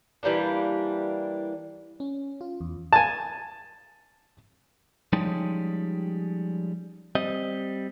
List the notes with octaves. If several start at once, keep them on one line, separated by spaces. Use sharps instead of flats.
E3 G3 A#3 D4
C#4
F4
E2
G#5 A5
F3 G3 G#3 C#4 D#4 G4
G3 C4 D#5